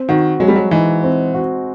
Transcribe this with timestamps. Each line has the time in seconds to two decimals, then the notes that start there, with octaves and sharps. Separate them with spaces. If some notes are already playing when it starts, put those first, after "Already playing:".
Already playing: C4
0.09 D#3 F#4
0.40 F#3 G#3
0.48 G3
0.56 F#3
0.71 E3 D#4
1.04 C4
1.34 F#4